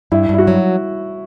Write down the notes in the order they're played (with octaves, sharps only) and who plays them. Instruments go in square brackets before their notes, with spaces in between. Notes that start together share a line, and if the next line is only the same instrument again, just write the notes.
[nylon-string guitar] G2 [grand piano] E4
[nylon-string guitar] G2 [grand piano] E4
[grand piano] F#4
[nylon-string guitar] F#3